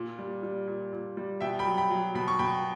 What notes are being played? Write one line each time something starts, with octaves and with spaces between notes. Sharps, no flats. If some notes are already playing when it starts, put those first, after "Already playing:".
Already playing: A#2
G3
G3
A#2
A#2
G3
B2 E5 G5
G5 B5
F#3
G5 B5
F#3
B2 B5
C#6
B2 G5 B5